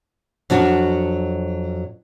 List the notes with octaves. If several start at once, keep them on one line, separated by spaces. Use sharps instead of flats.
F2 F#3 D4 F#4